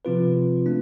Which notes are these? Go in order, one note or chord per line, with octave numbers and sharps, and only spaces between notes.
C3 F3 C4 F4 B4
A3 D4